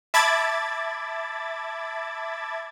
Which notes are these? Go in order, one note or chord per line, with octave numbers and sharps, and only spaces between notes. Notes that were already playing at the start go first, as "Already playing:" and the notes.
E5 A5 B5 D6 G#6 A6